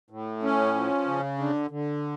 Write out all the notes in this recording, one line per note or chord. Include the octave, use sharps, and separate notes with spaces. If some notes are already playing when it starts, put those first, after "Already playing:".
A2
C#4
F3
C#3
D3
D3